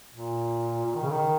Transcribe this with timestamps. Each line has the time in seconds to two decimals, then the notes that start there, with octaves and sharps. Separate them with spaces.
0.14 A#2
0.85 A#2
0.95 D#3
1.03 C#3
1.12 D#3